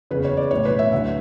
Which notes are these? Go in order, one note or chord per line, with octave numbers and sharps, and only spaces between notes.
F#1 E2 C#3 B4
C#5
D5
B1 A2 E3 C#5
B4
E5
D2 D3 F#3 E5